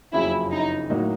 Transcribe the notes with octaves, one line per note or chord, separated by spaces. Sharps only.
F#1 F2 C#3 F#3 E4
D#4
A2 F#3 A#3 D#4 F#4